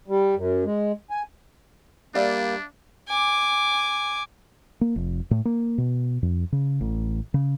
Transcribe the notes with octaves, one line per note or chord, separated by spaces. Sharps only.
G3
F#2
G#3
G#5
G3 A#3 D4 D5 E5 F5
G#5 D6
A#3
F1
A2
A#3
B2
F2
C#3
A1
C#3